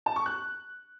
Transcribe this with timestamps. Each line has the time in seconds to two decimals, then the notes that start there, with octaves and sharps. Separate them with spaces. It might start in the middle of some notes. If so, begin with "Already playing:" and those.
0.06 A5
0.16 C#6
0.26 F#6